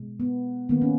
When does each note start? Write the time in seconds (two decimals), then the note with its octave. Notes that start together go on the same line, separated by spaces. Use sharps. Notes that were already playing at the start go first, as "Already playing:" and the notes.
Already playing: B2 G#3
0.20 B3
0.69 D#3 A#3 B3
0.81 C#4